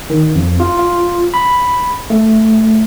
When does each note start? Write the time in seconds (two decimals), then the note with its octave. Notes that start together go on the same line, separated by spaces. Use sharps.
0.10 D#3
0.35 F2
0.60 F4
0.77 F4
1.34 B5
2.10 A3